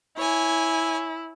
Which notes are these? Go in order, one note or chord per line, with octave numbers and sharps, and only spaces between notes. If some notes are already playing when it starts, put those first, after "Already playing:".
E4 C#5 G#5